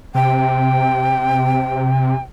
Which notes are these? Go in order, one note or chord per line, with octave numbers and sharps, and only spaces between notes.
C3 G5